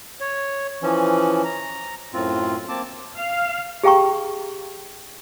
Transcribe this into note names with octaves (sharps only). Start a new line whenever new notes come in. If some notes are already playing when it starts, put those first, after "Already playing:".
C#5
E3 F3 C#4
A#5
F#2 A2 C4 F4
A#3 C4 A5 D6
F5
G4 G#4 F5 G5 A#5 C#6